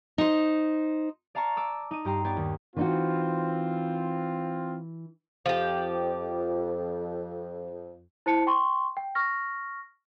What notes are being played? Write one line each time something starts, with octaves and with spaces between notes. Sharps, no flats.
D#4 C5
D5 F5 A5 A#5 C#6
D6 E6
D#4 D#7
G2 G4 A#5 C6
B3 G4 C#5 D5
D#2
E3 C4 D#4 F4 F#4
F2 F3 G4
E4 C5 A5 C#7
G5 C6 C#6
G5
C#6 F6 A#6